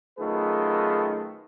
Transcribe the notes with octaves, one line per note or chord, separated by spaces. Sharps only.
F#2 D#3 A3 F4 G#4 B4